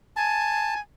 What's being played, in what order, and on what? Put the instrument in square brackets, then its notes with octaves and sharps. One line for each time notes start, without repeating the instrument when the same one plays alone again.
[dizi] G#5 [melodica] A5